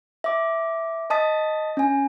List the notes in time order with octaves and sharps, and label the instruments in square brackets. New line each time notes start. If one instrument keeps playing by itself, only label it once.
[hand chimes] E5 D6
D#5 A5 D#6 A6 B6
C#4 G#5